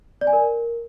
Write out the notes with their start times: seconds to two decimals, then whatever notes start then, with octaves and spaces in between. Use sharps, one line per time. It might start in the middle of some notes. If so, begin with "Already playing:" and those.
0.21 D5
0.27 G#5
0.33 A#4